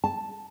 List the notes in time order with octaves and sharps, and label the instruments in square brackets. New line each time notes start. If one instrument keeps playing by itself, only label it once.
[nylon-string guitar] A5